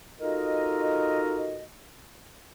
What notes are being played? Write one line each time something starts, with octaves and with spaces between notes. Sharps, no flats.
D#4 F4 F#4 A4 A#4 D#5